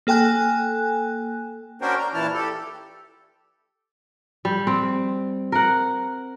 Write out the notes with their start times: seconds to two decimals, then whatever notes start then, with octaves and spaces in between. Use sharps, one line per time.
0.07 A#3 A4 G5 G#5 F#6
1.82 C#4 D4 F#4 A#4 C5 G5
1.99 A#5
2.14 A#2 E3 E4 A5 F6
2.34 G4 A4
4.45 G3
4.67 C4
5.52 A#4 F#5